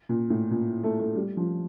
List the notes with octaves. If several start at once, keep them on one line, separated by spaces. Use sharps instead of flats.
A#2
A2
A#2
A3
A3
G3
F3